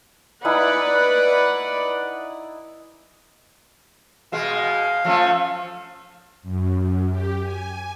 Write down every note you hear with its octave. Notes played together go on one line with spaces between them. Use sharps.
D#4 E4 B4 D5 F#5 G#5
B2 G#3 F5
F3 A3 C#4
F#2
G4
G#5